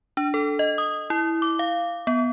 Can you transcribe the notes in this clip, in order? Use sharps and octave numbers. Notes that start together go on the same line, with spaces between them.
D4
A4
D#5
D#6
E4
D6
F5
B3